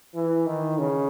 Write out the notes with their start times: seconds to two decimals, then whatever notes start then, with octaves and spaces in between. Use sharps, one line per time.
0.15 E3
0.46 D#3
0.78 C#3